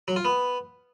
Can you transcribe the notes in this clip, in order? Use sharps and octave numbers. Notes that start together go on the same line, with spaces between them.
F#3
F4
B3